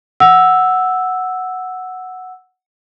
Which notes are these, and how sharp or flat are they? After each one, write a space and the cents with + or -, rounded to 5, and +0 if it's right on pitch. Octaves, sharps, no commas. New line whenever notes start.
F#5 +0 E6 +0